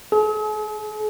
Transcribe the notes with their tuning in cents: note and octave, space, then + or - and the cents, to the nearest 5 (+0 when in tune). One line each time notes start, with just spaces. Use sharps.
G#4 +45